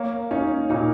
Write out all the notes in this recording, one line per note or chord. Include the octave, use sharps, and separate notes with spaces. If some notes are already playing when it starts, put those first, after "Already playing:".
Already playing: A#3 C#5
C#4 D#4
A#2 D#4